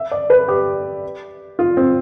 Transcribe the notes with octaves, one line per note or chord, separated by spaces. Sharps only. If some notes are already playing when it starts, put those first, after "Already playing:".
Already playing: E5
D5
B4
G4
F4
C4